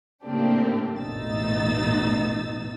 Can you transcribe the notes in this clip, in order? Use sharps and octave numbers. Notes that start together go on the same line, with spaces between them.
A2 C#3 A#3 C4 D4 G4
A1 E2 B2 D#4 E6 A6